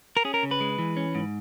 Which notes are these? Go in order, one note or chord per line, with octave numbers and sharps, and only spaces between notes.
A#4
C#4 G#4
A#4
C#3
B4
G#3
E3
C#4
G#2